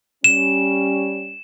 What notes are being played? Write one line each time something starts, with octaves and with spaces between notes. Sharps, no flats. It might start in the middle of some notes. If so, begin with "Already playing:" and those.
G3 C#4 E7